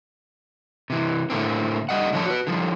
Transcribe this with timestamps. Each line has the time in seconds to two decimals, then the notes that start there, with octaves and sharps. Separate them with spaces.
0.90 C3 E3
1.30 A2 D3 A#3 C4
1.89 D3 G3 D#5 F#5
2.13 D3 F3 C#5 D5 A5
2.26 F#4 B4
2.47 D3 F3 G3